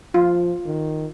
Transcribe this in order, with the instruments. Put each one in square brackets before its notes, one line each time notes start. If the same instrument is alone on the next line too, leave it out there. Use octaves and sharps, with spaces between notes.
[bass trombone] F3 [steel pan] F4
[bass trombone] D#3